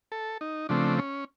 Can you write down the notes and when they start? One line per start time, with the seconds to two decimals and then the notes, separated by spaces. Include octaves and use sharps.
0.12 A4
0.41 D#4
0.69 C#3 F3 A3 C4 D4
0.99 C#4